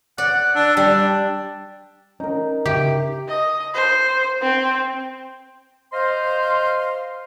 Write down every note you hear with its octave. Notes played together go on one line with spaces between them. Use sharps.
D5 F#5
D4 E6
G3 D4
C#4 D#4 A#4
C#3 G4 E5 D6
D#5
C5
C4
C5 D#5 F5 C6